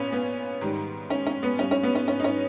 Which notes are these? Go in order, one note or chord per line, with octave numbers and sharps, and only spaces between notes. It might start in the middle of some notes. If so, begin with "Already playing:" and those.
Already playing: A#2 B3 C#4 B4
B3
G#2 D#3 G3
C#4
C#4
B3
G2 G3 C#4
C#4
B3
C#4
C#4
D#4
C#4